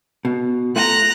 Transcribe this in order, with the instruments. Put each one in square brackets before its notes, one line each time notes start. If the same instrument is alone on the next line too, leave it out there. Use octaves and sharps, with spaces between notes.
[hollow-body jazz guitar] B2
[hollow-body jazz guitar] A3 F4 [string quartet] A#5 F#6